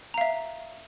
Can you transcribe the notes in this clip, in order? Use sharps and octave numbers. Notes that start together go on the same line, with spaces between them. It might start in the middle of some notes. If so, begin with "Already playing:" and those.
E5 F5 A#5